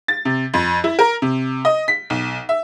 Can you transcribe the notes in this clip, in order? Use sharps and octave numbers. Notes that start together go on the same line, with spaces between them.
A6
C3
F2
E4
A#4
C3
D#5
B6
B1
E5